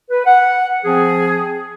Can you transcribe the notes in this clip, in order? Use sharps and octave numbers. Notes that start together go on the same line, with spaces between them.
B4
F#5
F3 C4 G#4